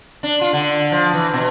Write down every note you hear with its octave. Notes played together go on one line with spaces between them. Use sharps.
D4
F4
D3
F3
E3
B2